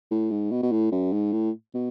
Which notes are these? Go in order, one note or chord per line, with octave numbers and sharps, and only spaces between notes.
A2
G#2
B2
B2
A2
F#2
G#2
A2
B2